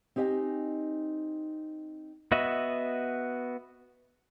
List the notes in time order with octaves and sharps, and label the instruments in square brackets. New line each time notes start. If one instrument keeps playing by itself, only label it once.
[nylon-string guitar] C4 D#4 G4 D#5 G#5
[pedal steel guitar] B3 F#4 D#5 E5